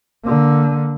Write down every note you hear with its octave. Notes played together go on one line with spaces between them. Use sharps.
D3 A#3